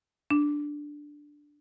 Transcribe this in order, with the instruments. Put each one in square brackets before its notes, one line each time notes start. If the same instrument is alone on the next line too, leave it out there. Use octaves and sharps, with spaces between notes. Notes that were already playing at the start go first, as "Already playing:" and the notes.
[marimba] D4